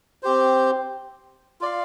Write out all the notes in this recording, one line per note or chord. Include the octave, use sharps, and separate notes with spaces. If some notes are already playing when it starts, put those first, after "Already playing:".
C4 G4 C5
F4 D5 F5